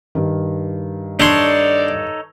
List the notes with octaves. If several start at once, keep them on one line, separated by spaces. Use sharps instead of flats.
G2 D#3
D4 D#4 A4 C#5 D5 C6